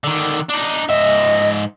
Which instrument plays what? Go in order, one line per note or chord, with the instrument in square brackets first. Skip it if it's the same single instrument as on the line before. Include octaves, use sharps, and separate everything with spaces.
[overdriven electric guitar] D3 D#3
D4 D#4
[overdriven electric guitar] G#2 E5 [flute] D#5